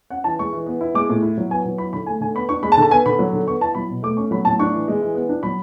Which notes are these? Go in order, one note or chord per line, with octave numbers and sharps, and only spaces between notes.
C#4 F#5
E3 A5
G#3 C#6
E3
B3
E4
G#3 D6
A2
E4
F#3
B3 G#5
F#3
E4 B5
D3 B5
A3 G#5
D3 G#5
B3 B5
D4 C#6
G#3 B5
A5
D3
A5
B3 G#5
D3 B5
F#3
D3
B3 C#6
E4 A5
F#3 B5
B2
A3 D6
C#4 C#6
F#3 B5
A2 A5
D4 C#6
E3
G#3
E3
B3
D4
F#3 B5